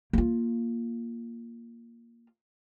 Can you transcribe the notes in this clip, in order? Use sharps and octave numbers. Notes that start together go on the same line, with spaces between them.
A#3 F4